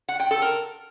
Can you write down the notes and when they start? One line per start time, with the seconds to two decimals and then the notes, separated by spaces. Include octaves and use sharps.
0.09 F#5
0.20 G5
0.31 A4
0.42 A#4